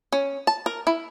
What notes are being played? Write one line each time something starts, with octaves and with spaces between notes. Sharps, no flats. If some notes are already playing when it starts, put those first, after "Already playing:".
C#4
A5
A#4
E4